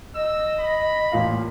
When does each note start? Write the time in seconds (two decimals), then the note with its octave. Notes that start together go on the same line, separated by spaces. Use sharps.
0.15 D#5 E6
0.60 B5
1.12 A1 A#2 F5